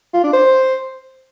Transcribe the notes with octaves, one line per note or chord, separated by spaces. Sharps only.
F4
D4
C5